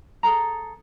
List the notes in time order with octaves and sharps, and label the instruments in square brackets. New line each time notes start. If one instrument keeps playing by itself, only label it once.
[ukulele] G#4 A4 A#5